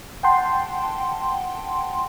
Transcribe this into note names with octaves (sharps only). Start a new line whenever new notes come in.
F#5 G5 A5 C6